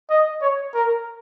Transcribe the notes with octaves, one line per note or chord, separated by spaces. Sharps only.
D#5
C#5
A#4